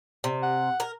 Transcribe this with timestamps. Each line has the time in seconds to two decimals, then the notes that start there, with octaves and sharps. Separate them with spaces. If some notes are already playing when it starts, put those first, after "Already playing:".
0.24 C3
0.42 F#5
0.80 A#4